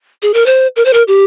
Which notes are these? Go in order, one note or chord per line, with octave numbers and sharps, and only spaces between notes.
G#4
A#4
C5
A#4
C5
A#4
G4